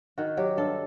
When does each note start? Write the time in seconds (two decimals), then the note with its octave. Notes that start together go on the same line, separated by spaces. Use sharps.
0.18 D#3 F#4
0.37 F#3 G4
0.57 G2 A4